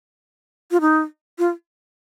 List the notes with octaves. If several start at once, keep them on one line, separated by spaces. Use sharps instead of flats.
F4
D#4
F4